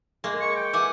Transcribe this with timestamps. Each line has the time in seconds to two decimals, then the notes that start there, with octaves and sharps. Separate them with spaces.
0.24 G#3 A#3
0.41 C#6
0.56 G5
0.73 E3 F#5 G#5 D6